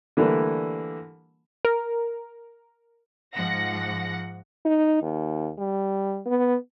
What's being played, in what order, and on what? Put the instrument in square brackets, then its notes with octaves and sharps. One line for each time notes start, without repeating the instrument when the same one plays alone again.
[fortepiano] D3 E3 G3 A3 A#3 E4
[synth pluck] A#4
[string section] G#2 F3 F#5 A#6
[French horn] D#4
D#2
G3
B3